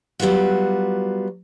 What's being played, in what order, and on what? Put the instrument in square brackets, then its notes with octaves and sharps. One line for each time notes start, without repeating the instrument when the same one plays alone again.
[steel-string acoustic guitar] F#3 G3 B3 F4 F#4